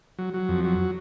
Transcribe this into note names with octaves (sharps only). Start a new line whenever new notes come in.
F#3
F#3
F2
F#3